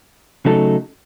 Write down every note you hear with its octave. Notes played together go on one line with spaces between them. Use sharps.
C#3 F#3 A3 D#4 A4